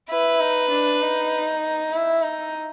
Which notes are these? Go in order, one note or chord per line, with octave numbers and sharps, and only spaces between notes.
E4 B4
D#4
D4
D#4
E4
D#4